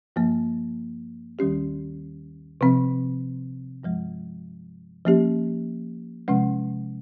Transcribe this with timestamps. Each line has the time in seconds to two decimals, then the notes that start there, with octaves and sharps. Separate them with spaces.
0.16 G2 F3 A#3
1.39 D#2 D#3 G3 C#4 G4
2.61 C3 F3 C4
3.83 G2 F3 G#3
5.05 F3 A#3 C#4 G4
6.28 C3 F3 G#3 C#4